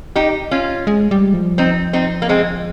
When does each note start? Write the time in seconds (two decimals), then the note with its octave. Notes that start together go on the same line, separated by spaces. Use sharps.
0.16 D#4 G4
0.51 C#4 F4
0.87 G#3
1.11 G3
1.34 F3
1.58 C4 D#4
1.93 C4 D#4
2.22 A#3
2.29 G#3 C4